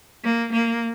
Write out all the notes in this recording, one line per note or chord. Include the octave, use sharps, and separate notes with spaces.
A#3
A#3